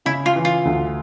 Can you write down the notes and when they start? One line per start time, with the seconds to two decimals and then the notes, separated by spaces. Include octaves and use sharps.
0.06 C#3 E4
0.26 F4
0.36 E3
0.45 F4
0.65 D2